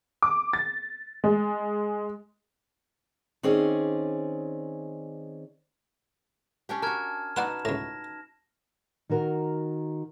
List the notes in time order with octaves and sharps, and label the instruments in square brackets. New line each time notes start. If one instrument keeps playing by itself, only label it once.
[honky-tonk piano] D6
A6
G#3
[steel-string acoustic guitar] D#3 C4 C#4 G#4 D5
[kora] C#4 D4 G4
[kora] F#4 A#4 [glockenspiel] A5 F6 G#6
[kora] D#4 F#4 B4 [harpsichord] D5 F#5 C6 [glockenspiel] E7
[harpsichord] C#2 A2 [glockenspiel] A#6
[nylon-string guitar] D#3 F#4 A#4